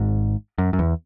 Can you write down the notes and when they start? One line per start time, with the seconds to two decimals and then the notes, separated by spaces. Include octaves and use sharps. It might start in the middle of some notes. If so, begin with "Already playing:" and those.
Already playing: G#1 G#2
0.58 F#2
0.73 F#2
0.79 E2